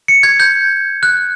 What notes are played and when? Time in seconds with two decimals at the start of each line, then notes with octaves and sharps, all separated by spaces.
0.08 C#7
0.23 G#6
0.40 G6
1.03 F#6